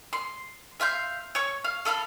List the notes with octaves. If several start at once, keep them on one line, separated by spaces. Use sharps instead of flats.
C6
E5 F5 C6 G6
C#5 C#6
F5
A4 E5 F5 B5